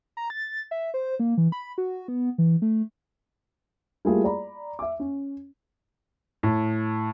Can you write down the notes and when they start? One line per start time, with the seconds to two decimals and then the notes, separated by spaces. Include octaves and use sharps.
0.17 A#5
0.30 A6
0.71 E5
0.94 C5
1.20 A#3
1.38 E3
1.52 B5
1.78 F#4
2.08 B3
2.38 E3
2.62 A3
4.05 G3 A3 A#3 E4 F4 G#4
4.24 D5 A#5 B5
4.79 E5 D6
5.00 C#4
6.43 A2